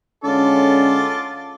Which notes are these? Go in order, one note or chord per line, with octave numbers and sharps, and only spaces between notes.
D3 G#3 C#4 F4 A4 D5